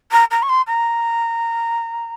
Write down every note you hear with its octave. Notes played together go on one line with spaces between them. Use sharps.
A#5
A#5
C#6
C6
A#5